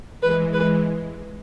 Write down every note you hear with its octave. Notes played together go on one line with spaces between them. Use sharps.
E3 G#3 B4
E3 G#3 B4